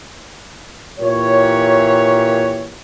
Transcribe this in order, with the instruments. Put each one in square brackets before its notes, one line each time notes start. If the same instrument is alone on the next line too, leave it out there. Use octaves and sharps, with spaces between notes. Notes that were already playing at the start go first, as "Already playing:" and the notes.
[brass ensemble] A#2 E3 G4 C#5